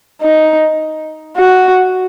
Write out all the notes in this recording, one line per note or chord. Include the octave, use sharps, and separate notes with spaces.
D#4
F#4